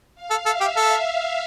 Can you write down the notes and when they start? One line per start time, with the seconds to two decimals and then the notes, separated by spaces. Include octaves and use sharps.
0.15 F5
0.30 A4
0.46 A4 E5
0.60 G4
0.76 A4